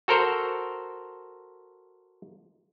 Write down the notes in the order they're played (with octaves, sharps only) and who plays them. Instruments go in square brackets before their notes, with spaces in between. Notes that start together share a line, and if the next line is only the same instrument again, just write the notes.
[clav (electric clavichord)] F#4 A4 A#4 C5